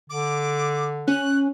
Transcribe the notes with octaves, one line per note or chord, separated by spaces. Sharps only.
D3 D6
C#4 F#6